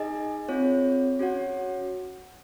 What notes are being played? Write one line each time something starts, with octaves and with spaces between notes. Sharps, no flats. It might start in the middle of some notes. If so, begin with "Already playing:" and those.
Already playing: D#4 G#4 D#5 G#5
C4 F4 G#4 C#5
C#4 F#4 C#5 F#5